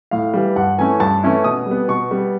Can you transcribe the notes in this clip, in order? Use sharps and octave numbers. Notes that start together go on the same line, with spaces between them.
A2 F5
E3 G3
G2 F#5
E3 A3 C#4 E4 G#5
G2 A5
E3 A3 C#4 E4
B2 D#6
G3
B3
B2 C#6
G3 B3